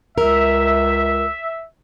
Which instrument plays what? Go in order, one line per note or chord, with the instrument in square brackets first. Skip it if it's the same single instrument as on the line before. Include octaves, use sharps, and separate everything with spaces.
[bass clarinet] C#2 [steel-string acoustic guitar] A#4 [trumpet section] E5